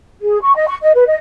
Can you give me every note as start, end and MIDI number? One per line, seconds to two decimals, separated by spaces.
0.21 0.41 68
0.41 0.55 85
0.56 0.65 75
0.67 0.77 85
0.82 0.91 75
0.95 1.05 71
1.07 1.17 75